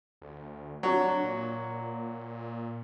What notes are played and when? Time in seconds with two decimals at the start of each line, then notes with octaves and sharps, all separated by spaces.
0.22 D2
0.83 F#3 D4
1.24 A#2